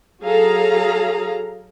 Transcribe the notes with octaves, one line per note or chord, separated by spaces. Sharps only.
F#3 G#4 A4 F5 A#5